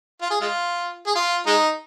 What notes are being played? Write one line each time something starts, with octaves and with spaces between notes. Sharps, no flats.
F4
G#4
G#3 F4
G#4
F4
G#3 D#4